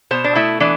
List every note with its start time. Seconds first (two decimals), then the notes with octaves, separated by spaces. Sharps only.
0.11 B2 C5
0.24 D4
0.35 A3 E4
0.60 E3 D4